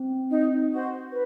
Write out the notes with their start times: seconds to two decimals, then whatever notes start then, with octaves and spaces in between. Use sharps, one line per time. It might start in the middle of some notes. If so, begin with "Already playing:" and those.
Already playing: C4
0.29 D#4
0.70 F#4 C5
1.10 B4